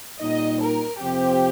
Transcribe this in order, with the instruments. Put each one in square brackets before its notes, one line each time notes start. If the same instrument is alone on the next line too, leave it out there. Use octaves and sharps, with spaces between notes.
[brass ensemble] A#2 G3 D#4 [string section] D#5
[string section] A#4
[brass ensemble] F2 C3 F3 C4 [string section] G4